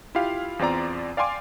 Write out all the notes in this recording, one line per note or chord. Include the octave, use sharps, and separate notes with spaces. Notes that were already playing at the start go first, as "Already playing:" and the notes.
E4 F4 G4 F5
E2 C4 F4 D5 A#5
D5 F5 G5 G#5 C6 D6